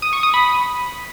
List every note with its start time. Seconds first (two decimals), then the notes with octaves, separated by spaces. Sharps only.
0.02 D#6
0.13 C#6
0.23 D#6
0.34 B5